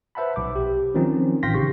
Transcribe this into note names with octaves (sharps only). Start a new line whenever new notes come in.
B4 C5 E5 F#5 A5 B5
B1 D6
G4
D#3 F3 F#3 C4 C#4 D#4
A1 F5 G5 C6 A#6 B6
C#3 G4 C#6